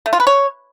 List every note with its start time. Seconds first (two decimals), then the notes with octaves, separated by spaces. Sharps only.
0.06 A3
0.13 F4
0.20 B4
0.27 C#5